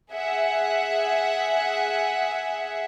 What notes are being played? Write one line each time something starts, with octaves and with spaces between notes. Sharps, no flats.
G#4 E5 F#5